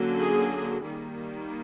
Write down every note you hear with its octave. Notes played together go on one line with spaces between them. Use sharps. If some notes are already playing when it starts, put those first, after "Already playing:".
Already playing: D3 F#3 A#3 C#4
G#4
D#3 G3 A#3